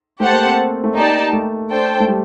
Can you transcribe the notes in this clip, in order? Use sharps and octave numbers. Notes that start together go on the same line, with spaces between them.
A3 G4 C5 F#5 A5
A#3
C4
A3
A#3 D#4 G4 D5 A5
A3
D4 A4 C5 G5
A3
G3